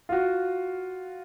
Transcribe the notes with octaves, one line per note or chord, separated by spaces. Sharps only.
F4 F#4